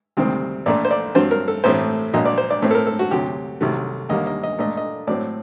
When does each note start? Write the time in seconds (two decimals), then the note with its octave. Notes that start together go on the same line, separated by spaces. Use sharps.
0.17 D2 C3 D#3 G3 C4
0.66 A#1 A#2 A3 D4 D5
0.85 C5
0.91 D5
1.15 G2 F#3 C4 C5
1.31 A#4
1.48 A4
1.64 A1 A2 A3 C4 C5
2.13 A#1 A#2 F#3 D#5
2.25 D5
2.38 C5
2.51 D5
2.62 A2 A3 C4
2.71 A4
2.75 A#4
2.87 A4
2.99 F#4
3.11 D2 C3 F#3 G4
3.61 C2 C3 D#3 F#3 A3
4.09 D#2 D3 G3 A#3 D#5
4.27 D#5
4.43 D#5
4.58 A#2 A3 D4 D#5
4.77 D#5
5.07 A2 F#3 C4 D5